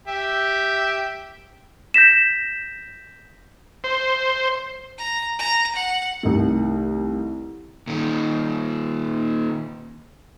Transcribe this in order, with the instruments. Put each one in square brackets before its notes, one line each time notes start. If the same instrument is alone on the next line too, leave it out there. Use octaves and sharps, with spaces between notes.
[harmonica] G4 E5
[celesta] G6 A#6 B6 E7
[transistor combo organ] C5
[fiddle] A#5
A#5
F#5
[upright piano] C2 D#3 A3
[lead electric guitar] A#2 D#3